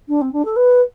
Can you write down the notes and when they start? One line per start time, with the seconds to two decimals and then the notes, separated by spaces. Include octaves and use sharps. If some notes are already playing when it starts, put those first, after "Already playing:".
0.08 D4
0.21 C4
0.32 D4
0.45 A4
0.56 B4